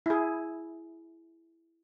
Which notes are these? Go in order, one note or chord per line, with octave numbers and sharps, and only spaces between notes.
E4 G#4